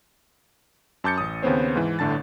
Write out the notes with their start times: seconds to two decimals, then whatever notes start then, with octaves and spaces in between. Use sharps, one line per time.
1.04 F#2 A5 D6 G6 A6 C#7
1.18 A1 D#6
1.42 D#2 C#3 B3 C4 C5 C#5
1.75 G#2 E3
1.99 G1 A2 D3 A5 A6